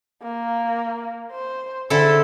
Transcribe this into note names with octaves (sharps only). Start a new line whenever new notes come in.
A#3
C5
D3 E4 A4 C5